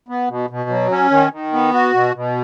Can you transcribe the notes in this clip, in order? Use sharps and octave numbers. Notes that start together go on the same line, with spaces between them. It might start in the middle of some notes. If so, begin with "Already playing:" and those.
B3
B2
B2
F#3
C#4
D#3
D#3
B3
F#4
B2
B2